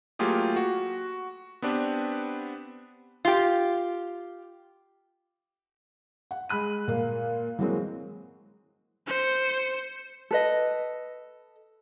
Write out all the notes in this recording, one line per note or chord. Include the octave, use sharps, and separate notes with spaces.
F#3 A3 A#3 F4 G4 G#4
F#4
B3 C4 D4 G4 B4
F4 G4
F#5
G#3 B5 F#6 D#7
A#2 A#3
E3 F#3 G#3 A#3 C4
C5 C#7
A4 B4 D#5